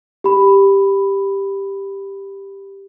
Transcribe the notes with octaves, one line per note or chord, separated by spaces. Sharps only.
G4 B5